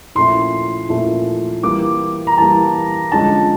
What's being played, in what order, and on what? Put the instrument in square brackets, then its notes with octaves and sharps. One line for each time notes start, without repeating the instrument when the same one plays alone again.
[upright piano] A#2 F3 A3 C#4 E4 [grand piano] C6
[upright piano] A#2 F3 A3 C#4 E4
[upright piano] E3 G3 A#3 [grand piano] D6
[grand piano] A#5
[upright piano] E3 G3 A#3 [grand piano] A5
[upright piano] D3 F3 G#3 C#4 [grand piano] A5